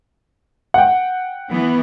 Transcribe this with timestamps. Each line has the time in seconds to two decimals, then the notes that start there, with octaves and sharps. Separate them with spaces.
0.74 F#5 G5
1.50 E3 B3